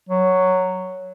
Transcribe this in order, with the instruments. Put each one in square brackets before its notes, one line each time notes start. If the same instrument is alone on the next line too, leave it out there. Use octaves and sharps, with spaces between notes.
[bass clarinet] F#3